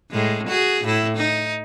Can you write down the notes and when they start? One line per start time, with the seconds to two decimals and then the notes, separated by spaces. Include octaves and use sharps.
0.11 A2 G#3
0.47 F#4 G#4
0.84 A2 E4
1.17 D#4